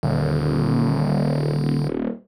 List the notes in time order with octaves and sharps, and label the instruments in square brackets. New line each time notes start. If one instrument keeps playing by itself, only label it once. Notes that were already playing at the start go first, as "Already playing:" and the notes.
[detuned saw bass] D#1 [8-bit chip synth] D3